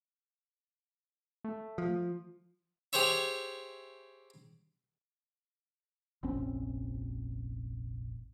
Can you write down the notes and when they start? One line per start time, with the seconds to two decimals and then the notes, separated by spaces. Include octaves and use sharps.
1.44 A3
1.78 F3
2.93 G4 G#4 C5 C#5 E5
6.23 F1 A#1 C4 C#4